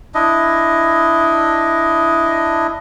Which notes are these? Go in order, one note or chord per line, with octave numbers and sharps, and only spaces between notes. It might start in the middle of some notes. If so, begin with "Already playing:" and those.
D4 E4 D#5